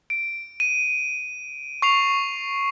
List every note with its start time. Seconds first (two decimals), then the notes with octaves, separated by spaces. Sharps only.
0.10 D7
0.60 D#7
1.82 C#6 C7 F7